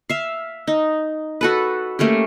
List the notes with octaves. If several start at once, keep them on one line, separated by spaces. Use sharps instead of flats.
E5 F5
D#4
F#4 A4 B4
A3 A#3 C#4 G4